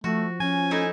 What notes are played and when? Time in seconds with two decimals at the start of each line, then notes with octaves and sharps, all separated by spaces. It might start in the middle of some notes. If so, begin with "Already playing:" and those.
0.04 F3 A3 F#4
0.40 F3 C#4 G#5
0.71 A3 D#4 E4